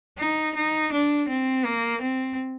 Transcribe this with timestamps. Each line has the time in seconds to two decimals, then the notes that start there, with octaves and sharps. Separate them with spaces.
0.19 D#4
0.55 D#4
0.92 D4
1.29 C4
1.65 A#3
2.02 C4